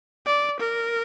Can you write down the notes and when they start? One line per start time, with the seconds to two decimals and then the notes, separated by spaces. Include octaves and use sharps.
0.26 D5
0.59 A#4